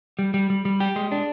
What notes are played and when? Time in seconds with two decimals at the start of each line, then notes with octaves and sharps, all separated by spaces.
0.19 G3
0.34 G3
0.50 G3
0.65 G3
0.80 G4
0.96 G#3
1.12 D4